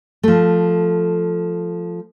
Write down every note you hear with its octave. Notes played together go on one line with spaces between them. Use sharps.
F3 A3